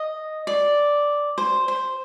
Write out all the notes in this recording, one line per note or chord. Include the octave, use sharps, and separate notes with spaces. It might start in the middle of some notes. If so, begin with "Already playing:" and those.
Already playing: D#5
D5
C5
C5